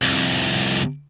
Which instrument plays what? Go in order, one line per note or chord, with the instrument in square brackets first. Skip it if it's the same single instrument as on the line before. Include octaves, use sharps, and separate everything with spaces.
[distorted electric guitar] C2 F2